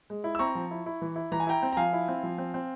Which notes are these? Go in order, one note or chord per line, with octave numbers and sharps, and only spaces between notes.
G#3
E4
E6
C4 A#5 C#6
F3
E4
E4
E3
E4
E3 A#5
G#5
E4 G5 A#5
C4
A#5
F3 F5 G#5
E4
C4
F3
C4
C4